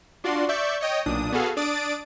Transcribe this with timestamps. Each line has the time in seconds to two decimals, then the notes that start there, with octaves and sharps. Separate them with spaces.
0.24 D4 F4 F#4 D5 C6
0.49 D5 E5 C#6 G6
0.81 C#5 D#5 G5
1.06 B1 A#2 D4 D#6
1.32 B3 F#4 G#4 A4 F5
1.57 D4 D5 D#6 A6 D7